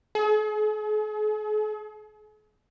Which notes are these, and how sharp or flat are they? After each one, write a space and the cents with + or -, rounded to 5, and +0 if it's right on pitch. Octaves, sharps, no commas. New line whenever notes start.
G#4 +45